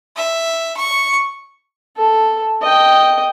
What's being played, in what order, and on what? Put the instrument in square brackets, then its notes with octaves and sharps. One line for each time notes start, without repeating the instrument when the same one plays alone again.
[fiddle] E5
C#6
[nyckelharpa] A4
D#5 G5